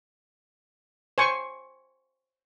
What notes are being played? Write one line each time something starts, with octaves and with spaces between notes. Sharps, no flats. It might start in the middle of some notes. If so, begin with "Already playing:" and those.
C5 G#5 C#6